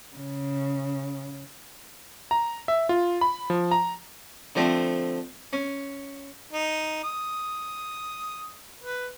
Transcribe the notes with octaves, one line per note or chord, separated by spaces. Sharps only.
C#3
A#5
E5
F4
B5
F3
A#5
D3 F3 A3 C4
C#4
D#4
D#6
B4